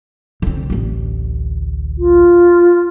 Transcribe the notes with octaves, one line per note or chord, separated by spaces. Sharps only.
D3 C4
A1 D2
F4